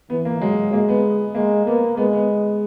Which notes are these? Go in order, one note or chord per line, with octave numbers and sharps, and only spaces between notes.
E3 B3
A#3
F#3 G#3
G#3 A#3
B3
G#3 A#3
A#3 B3
G#3 B3
B3